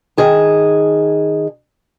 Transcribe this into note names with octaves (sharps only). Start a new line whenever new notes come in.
D#3 G#4 A5